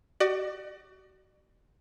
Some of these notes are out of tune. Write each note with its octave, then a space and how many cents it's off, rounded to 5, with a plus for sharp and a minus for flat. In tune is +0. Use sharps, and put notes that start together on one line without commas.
F#4 +35 D5 +35